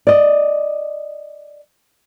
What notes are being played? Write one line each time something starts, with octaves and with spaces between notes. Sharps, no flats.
D5 D#5